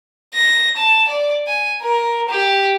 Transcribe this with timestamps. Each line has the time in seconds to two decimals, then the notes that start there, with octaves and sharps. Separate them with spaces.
0.34 A#6
0.77 A5
1.08 D5
1.47 G#5
1.81 A#4
2.29 G4